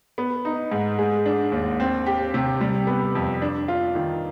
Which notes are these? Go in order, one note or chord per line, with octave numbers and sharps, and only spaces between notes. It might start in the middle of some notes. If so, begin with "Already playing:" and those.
B3
D#4
G#2
G#3
D4
D#2
C4
G4
C3
G3
B3
F2
D4
F4
D#3